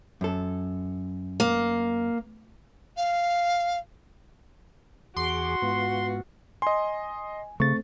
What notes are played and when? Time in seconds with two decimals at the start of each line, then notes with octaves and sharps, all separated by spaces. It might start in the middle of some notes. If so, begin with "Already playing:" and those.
0.21 F#2 A4
1.40 A#3
2.97 F5
5.16 E2 F#4 G#4 C6 D6
5.62 G#2 B3 F4
6.62 D#5 G#5 C6
7.60 C#3 A3 C4 C#6 A6